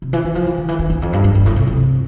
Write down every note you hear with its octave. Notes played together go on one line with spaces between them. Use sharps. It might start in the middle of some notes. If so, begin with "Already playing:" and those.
C3
E3
E3
F3
E3
D3
E3
D3
E2
F2
G2
G2
G2
A2
C3
C3